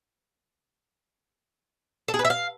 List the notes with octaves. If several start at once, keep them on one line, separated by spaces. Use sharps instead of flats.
A4
G#4
B4
E5
F5